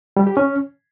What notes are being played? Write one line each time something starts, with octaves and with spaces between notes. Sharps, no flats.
G3
G4
C#4